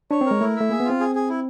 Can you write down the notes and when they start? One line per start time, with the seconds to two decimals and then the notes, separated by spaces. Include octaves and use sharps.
0.11 D4 C#5
0.21 C4
0.26 G#3 A#4
0.41 A3 E4
0.56 A3 E5
0.70 A#3 G#4
0.80 B3
0.85 F4
0.90 C4
1.00 G#4
1.15 G#4
1.30 E4